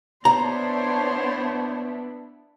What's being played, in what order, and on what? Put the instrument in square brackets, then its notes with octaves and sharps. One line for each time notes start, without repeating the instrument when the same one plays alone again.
[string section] B3 D4 E4 [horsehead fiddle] C5 C#5 [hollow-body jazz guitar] A#5